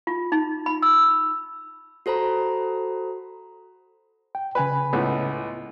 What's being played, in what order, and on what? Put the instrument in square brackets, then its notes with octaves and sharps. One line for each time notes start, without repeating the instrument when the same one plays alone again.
[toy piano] F4
D#4
B5
E6
[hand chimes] F#4 A4 C5 A#5 B5
[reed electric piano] G5
[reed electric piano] C#3 G#5 B5 [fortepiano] B4
[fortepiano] C#2 A2 B3